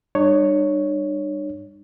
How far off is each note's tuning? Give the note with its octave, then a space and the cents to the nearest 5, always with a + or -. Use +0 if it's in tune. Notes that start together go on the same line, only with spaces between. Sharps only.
G3 +20 D4 +45 C#5 +0